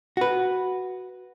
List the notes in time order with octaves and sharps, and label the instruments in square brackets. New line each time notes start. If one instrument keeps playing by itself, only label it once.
[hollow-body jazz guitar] F#4 B4